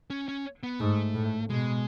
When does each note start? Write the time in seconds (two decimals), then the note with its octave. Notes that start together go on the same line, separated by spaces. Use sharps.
0.10 C#4
0.28 C#4
0.63 B3
0.80 G#2 A3
1.14 A2
1.49 B2 G#3